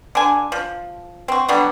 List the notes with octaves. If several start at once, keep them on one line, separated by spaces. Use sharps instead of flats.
D3 G#5
F3
C4 F#4
D3 F#3 G3 B3